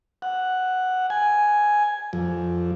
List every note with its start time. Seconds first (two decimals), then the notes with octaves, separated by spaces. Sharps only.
0.22 F#5
1.10 G#5
2.13 F2